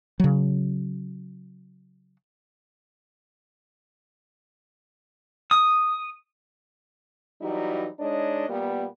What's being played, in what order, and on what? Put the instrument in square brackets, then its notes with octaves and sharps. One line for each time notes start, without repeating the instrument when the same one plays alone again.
[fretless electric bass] C#3 F#3
[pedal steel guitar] D#6
[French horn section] E3 F#3 G3 D#4 E4
G#3 D4 D#4 C#5 D#5
A#2 G3 A#3 B3